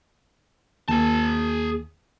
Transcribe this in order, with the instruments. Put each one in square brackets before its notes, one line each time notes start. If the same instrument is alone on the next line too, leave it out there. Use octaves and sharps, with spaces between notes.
[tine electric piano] D#2 [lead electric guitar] G#4 A5